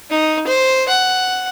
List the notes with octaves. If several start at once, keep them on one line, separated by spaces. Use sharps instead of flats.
D#4
C5
F#5